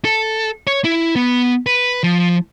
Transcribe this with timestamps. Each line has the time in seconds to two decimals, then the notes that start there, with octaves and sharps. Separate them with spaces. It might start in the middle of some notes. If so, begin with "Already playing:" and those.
0.05 A4
0.67 C#5
0.84 E4
1.16 B3
1.66 B4
2.03 F3